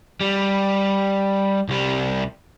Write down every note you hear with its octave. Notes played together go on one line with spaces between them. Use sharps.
G3
C2 G3